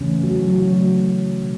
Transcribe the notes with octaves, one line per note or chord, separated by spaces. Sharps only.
C#3 E3 A3 C#4
F#3 F#4
F#3 F#4
C#3 F#3 A3
B2